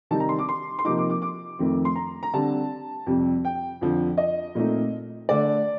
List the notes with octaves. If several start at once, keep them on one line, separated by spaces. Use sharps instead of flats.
C3 D#3 G3 C4 D#4 A5
A#5
C6
D6
C6
C6
C3 F3 A#3 D#4 D6
D6
D6
D6
F2 D#3 A3 C4
C6
A#5
A#5
D3 G3 C4 A5
F2 C3 G3 C4
G5
F2 D3 F3
D#5
A#2 A3 C4 D#4
D3 A3 D4 D5